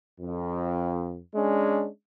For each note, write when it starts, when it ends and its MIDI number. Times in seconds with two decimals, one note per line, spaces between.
0.20 1.19 41
1.34 1.86 56
1.34 1.86 61
1.34 1.86 62